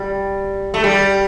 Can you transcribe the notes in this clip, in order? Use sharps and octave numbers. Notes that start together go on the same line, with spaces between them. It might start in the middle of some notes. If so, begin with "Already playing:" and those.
Already playing: G3
A3
G3